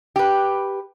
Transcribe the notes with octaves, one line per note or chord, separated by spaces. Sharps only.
G4 B4